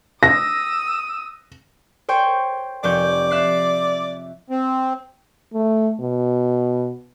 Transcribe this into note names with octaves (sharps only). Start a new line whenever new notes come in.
D#6 E6 A#6
C5 C#5 G5
F1 C#5 D5 G6
E5 F#6 C7
C4
A3
B2